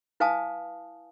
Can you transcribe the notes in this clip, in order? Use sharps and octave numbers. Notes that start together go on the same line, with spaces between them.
E4 B4 F5 G#5 A5 D#6